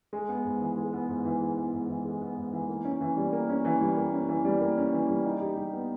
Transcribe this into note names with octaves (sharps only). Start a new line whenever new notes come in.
G#3
B3
G#2
E3
G#3
B3
G#2
E3
G#3
B3
G#2
E3
G#3
B3
G#2
E3
A#3
C#4
E3
G3
A#3
C#4
E3
G3
A#3
C#4
E3
G3
A#3
C#4
E3
G3
D#4
G4
G3
B3